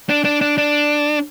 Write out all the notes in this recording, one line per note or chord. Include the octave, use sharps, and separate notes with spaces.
D4
D4
D4
D4